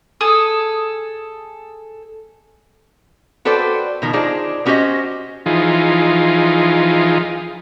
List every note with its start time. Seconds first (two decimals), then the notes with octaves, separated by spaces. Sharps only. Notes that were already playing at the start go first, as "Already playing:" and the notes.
0.21 G#4 A4
3.45 F#4 A4 B4 C5 D5 G5
4.02 B2 D#3 F3
4.13 D4 D#4 F4 G#4 C5 D5
4.66 B3 C#4 F#4 G4 C5 D#5
5.46 E3 F3 D#4 F4 G#4